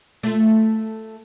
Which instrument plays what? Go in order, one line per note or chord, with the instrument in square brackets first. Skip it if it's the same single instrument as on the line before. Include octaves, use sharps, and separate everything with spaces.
[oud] A3 F4